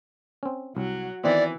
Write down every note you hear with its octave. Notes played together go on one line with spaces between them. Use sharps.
C4 C#4
C2 F#3
D#3 E3 B3 C4 D5